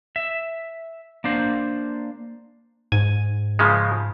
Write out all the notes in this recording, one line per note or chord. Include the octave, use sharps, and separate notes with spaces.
E5
A#3 D4 C5
G#2 G#5
C#3 F3 G#3